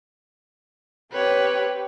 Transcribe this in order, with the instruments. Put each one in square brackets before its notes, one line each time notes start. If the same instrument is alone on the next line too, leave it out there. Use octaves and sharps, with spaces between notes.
[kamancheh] C4 G4 [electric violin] B4 C#5